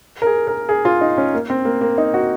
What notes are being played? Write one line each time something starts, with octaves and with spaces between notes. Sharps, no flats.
A#4
G#4
A#4
G#4
F4
D#4
C#4
A#3
C4
A#3
A#3
D#4
F#4